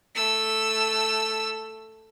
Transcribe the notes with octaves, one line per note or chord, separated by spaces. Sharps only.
A3 E6